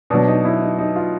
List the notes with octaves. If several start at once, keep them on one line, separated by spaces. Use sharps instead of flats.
B2 F#3 D4
D#4
E4
D#4
D#4
F4